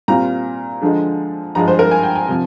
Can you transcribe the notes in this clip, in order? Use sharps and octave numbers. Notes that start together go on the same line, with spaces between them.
A#2 G3 C4 F4 A#5
D3 F3 G#3
G2 F3 G#3 A#5
C5
A#4
G#5
G5
G#5
C3 F3